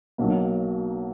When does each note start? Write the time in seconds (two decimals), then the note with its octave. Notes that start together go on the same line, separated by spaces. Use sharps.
0.18 B1 B2 F#3 A#3